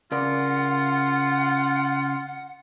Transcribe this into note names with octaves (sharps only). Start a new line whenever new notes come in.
C#3 F4 A#4 D5 F#5